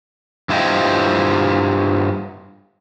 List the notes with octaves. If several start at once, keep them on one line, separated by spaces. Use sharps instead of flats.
G2 E4 F4 C5 D#5 G5